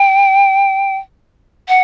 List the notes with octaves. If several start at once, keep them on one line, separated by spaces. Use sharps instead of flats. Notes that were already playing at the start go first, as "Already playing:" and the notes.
Already playing: G5
F#5